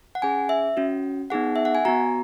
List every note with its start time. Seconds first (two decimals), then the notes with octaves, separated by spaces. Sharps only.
0.15 F#5
0.22 C#4 G#4 G#5
0.49 E5
0.77 C#4 F#4
1.30 B3 D#4 G#4 F#5
1.56 E5
1.65 F#5
1.75 G#5
1.85 B3 F#4 A#5